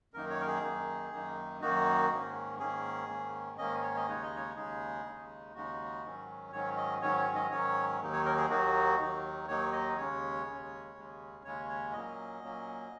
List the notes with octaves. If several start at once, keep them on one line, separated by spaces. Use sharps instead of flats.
F#2 D#3 A#3 D#4 A#4
C#5
A#4
G#4
F#2 D#3 A#3 D#4
F#2 D#3 A#3 D#4
F#2 D#3 A#3 D#4 F#4
G#2 D#3 A#3 C#4
G#2 D#3 A#3 C#4 G#4
G#2 D#3 A#3 C#4
G#2 D#3 A#3 C#4 D#5
C#5
D#5
D#2 C#3 G#3 D#4 C#5
D#5
C#5
D#2 C#3 G#3 D#4 G#4
D#2 C#3 G#3 D#4
D#2 C#3 G#3 D#4 F#4
G#2 D#3 F#3 C#4
G#2 D#3 F#3 C#4 C#5
D#5
G#2 D#3 F#3 C#4 C#5
C#5
D#5
G#2 D#3 F#3 C#4 C#5
D#2 D#3 F#3 A#3 D#4
C#5
A#4
G#4
D#2 D#3 F#3 A#3 D#4 F#4
D#2 D#3 F#3 A#3 D#4
D#2 D#3 F#3 A#3 D#4 C#5
D#5
D#2 C#3 G#3 C#4 C#5
D#2 C#3 G#3 C#4
D#2 C#3 G#3 C#4
D#2 C#3 G#3 C#4 C#5
C#5
A#2 F#3 A#3 C#4 D#5
A#2 F#3 A#3 C#4